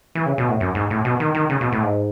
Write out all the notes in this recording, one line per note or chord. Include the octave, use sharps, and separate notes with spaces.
E3
C#3
B2
A2
F#2
G#2
A2
B2
D#3
D#3
C#3
B2
A2
G#2